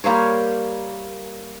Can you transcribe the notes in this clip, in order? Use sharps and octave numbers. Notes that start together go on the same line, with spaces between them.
G3 A#3 C5 C#5